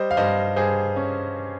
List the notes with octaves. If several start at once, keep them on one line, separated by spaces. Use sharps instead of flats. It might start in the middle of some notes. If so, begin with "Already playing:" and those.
Already playing: G3 C5 D#5
F5
G2 C5 D#5
G2 G#4 C5
C#4